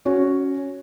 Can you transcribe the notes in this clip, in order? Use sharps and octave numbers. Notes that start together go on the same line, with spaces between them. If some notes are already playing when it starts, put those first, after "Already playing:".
C#4 F#4 C#5